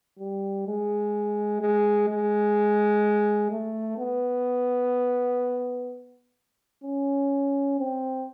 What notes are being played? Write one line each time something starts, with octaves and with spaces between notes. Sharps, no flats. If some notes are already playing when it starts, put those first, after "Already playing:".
G3
G#3
G#3
G#3
A3
B3
C#4
C4